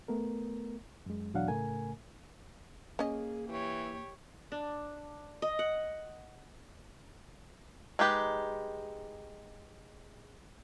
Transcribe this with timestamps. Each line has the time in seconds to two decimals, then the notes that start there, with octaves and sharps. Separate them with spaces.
0.08 A3 B3 A#4
1.06 F#2 G#3
1.34 E2 B2 F#3 D4 F5 F#5
1.48 A2 C#3 A3 A#4 G#5
2.99 A#3 C#4 G#4 D#5
3.48 E3 G4 C#5
4.52 D4
5.42 D#5
5.59 F#5
7.99 G#3 D#4 G4 B4